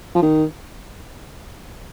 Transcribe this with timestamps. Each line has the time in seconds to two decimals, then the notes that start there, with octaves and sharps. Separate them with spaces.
0.15 F3
0.22 D#3